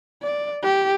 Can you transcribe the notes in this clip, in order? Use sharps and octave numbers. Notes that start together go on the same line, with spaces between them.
D5
G4